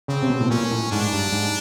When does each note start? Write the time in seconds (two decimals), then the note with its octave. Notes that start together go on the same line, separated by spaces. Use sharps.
0.08 C#3 C4
0.22 C3
0.30 B2
0.40 A2
0.50 A#2 C#4
0.71 A2
0.92 G#2 D4
1.13 G2
1.32 G#2